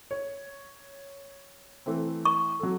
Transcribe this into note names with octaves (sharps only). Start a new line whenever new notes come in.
C#5
E3 A3 C4
C#6
F#3 A4